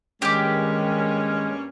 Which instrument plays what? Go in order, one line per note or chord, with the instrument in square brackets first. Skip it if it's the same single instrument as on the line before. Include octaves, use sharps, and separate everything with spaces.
[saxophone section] G2 A#3 C#4 [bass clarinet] D#3 [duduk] G#3 [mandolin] G4 D6